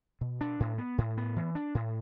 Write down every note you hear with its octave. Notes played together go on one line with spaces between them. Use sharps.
B2
D4
A2
B3
A2
B3
E3
D4
A2